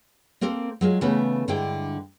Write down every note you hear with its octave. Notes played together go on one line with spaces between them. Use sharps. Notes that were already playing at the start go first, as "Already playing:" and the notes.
A#3 C4 A4 A#4
F#3 G#3 F4
C#3 E3 A3 B3
G2 D3 G#3 E4 G5